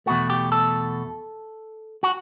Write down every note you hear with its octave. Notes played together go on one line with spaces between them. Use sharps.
E2 B2 A3 F#4
G4
A4
F#4